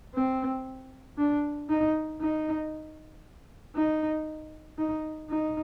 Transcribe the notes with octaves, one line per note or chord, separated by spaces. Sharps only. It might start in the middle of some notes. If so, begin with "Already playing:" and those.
C4
D4
D#4
D#4
D#4
D#4
D#4